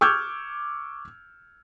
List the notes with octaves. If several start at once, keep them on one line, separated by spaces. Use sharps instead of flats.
C#6 D6 E6 F6 G6 G#6